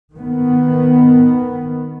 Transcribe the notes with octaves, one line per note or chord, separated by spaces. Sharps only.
D#3 B3